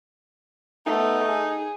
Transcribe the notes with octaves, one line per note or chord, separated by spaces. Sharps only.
A3 B3 D#4
G#4